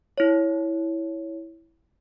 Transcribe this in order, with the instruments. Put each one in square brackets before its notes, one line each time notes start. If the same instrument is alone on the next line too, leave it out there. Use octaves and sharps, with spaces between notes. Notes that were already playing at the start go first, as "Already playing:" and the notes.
[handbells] E4 C#5